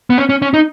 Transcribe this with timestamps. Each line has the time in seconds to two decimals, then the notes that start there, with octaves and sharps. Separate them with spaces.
0.10 B3
0.18 C#4
0.29 C#4
0.42 C#4
0.54 D#4